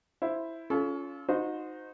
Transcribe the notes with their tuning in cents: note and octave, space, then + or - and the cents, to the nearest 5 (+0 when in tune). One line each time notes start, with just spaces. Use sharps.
E4 +0 C5 +0
C#4 +20 F4 +0 A4 -30
D#4 -5 F#4 -35 C5 -20